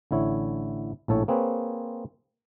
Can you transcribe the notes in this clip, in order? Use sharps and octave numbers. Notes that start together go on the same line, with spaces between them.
A1 D3 E4 C#5
A#1 A2 A4 C#5
A#3 C4 G#4 B4 C#5